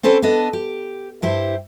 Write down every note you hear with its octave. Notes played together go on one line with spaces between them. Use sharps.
C4 C#4 A4 B4 C5 D5
B3 D4 A4 D#5
G4
G2 E4 G4 C5